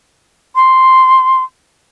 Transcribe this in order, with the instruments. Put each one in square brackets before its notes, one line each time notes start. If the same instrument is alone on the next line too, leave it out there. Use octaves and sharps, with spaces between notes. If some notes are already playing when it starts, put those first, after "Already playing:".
[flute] C6